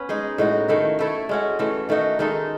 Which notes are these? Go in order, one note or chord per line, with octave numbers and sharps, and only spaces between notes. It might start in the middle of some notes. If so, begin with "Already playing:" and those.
Already playing: B3 C#4 B4
G#3 D#4 G#4
A2 G#3 D#4 F#4
D#3 A3 E4
A3 E4 A4 C#5
G#3 C#4 F#4
E3 A3 C#4
D#3 A3 D#4 F#4
D#3 G#3 D#4 A4